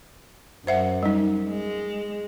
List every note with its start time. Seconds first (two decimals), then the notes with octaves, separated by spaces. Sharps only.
0.67 F#2 C5 E5 F#5
1.03 G3 D#4
1.47 G#3